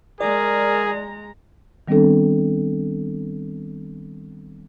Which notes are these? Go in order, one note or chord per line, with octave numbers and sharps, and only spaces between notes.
G#3 G#4 A#4 D5 A#5
D#3 G3 B3 C4 D4 A4